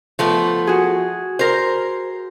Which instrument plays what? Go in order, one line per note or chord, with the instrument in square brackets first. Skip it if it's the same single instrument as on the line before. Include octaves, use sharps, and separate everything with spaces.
[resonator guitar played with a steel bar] F3 A3 B3
[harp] F#4 G#4
[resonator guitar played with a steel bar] A#4 C5